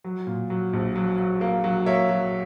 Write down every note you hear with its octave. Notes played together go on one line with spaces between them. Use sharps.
F#3
A#2
F#3
A#1
F#3
F#3
A#3
F#3
A#3 C#5 E5
F#3